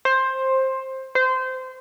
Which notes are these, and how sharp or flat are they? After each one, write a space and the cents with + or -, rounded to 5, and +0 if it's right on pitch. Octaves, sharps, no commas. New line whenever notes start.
C5 +15
C5 -20